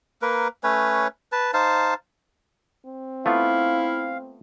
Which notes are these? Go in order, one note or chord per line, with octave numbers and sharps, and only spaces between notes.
A#3 A#4 B4
A3 C#4 B4 C#5
B4 A5
D#4 C5 F5 A5
C4
A3 B3 E4 F4 F5